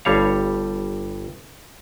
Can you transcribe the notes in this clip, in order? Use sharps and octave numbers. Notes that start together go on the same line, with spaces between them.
G1 G2 G3 C#5 F5